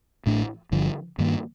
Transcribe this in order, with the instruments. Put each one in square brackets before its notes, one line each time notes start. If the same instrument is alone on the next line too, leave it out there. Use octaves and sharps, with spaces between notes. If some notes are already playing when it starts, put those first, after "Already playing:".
[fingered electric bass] A1 A2 A3 D4
G1 G2 D3 F3
G2 D#3 A#3